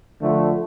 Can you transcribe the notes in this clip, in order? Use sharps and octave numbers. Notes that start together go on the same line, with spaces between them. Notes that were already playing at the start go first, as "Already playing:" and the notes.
D3 F3 A3